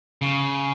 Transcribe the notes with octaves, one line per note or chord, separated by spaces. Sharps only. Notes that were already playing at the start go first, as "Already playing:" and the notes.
C#3